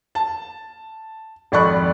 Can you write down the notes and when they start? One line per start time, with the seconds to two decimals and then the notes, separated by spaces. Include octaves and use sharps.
0.15 A5
1.52 G#1 F2 D5 B5 C#6 F#6